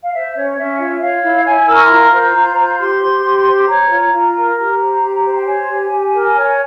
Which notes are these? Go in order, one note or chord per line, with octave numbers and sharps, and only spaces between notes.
F5
C5 E5
C#4 C#5
C#4 E5
F4 E5
C#5 F5
E4
E4 G#5
A#4 E6
C#6
C6
F4 A#5
C5
F4
C5
G4 C6
C5
G4
C5
C#5 A#5
F4
F4
A#4
G4 A#5
C5
G4
C5
G5
C#5 G#5
G4
G4
A#4
C#5